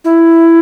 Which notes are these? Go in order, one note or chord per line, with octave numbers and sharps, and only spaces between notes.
E4